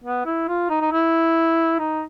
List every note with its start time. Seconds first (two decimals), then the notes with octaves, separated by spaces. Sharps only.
0.04 B3
0.26 E4
0.48 F4
0.70 D#4
0.81 D#4
0.92 E4
1.79 D#4